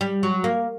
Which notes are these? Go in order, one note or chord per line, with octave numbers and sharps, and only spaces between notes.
G3
F#3
A#3